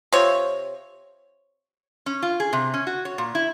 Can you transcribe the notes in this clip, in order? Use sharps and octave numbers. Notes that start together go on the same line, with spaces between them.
C3 F4 C#5
C#4
F4
G#4
C3
C#4
F#4
C#5
A#2
E4